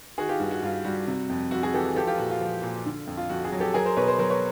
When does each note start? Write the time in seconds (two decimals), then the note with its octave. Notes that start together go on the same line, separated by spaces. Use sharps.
0.18 D#3 F#4 G#4
0.29 F4 G4
0.40 G2 F#4
0.51 F#4
0.62 G2 F4
0.85 G3 F#4
1.07 C3
1.30 F2
1.51 F2 F#4
1.63 F#4 G#4
1.73 E3 G4 A4
1.96 F3 G4 A4
2.07 F4 G4
2.18 A#2 F#4
2.30 F4
2.41 F3
2.63 A#2
2.86 D3
3.07 F2
3.17 F4
3.30 F2 F#4
3.44 F#4 G#4
3.52 F#3
3.60 G4 A4
3.74 F#3 G#4 A#4
3.85 A#4 C5
3.97 B2 B4 C#5
4.08 A#4 C5
4.18 F#3 A#4 C5
4.30 B4 C#5